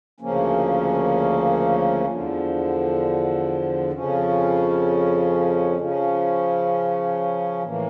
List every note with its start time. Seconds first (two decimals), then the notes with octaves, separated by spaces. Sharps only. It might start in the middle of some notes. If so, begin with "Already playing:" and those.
0.20 D2 C#3 F3 A#3 C#4
2.06 E2 D3 F3
3.91 F2 C#3 F3 C#4
5.77 C#3 F3 C#4
7.63 A2 E3 A#3